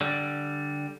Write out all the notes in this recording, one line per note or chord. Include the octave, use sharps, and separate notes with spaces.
D3 G3